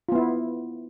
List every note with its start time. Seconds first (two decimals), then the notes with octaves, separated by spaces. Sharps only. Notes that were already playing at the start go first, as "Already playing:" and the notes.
0.09 F4
0.12 B3
0.15 E4